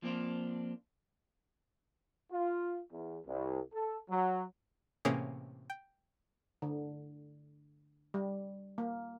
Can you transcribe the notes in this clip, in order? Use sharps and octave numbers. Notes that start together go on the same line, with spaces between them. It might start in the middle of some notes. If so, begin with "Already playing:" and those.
F3 A#3 C4 D4 F4
F4
E2
C2
A4
F#3
A2 C3 E3 A#3 C#4 G#4
G5
D3
G3
A#3